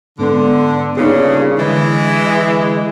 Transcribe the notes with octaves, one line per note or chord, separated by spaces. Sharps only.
G#2 D3 B3 C6
G2 A#2 C#3 D#4 G#4
D3 E3 G#3 A6